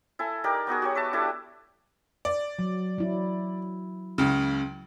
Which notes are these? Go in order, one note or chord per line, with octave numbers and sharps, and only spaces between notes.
E4 A4 G#5
D#4 G4 A#4 D5
B3 D#4 F#4 G#4
F#4 G4 C#5
B4 E5 A5
D4 E4 G4 A4
D5
F#3
F#3 E4
C#2 C#3